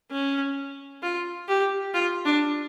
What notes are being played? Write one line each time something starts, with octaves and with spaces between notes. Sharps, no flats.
C#4
F4
G4
F4
D4